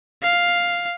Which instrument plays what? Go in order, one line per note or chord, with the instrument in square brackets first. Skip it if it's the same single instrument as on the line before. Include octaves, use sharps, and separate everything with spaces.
[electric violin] F5